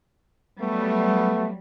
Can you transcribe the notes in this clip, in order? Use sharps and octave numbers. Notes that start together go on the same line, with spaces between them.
F#3 G3 A3 B3